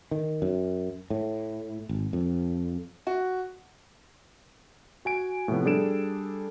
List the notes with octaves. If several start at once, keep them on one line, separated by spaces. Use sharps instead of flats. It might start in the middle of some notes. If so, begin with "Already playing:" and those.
D#3
F#2
A2
G#1
F2
F#4
F#4 G#5 D7
A2 C3 F3 B3
G3 D4 G#4 A4 D7 E7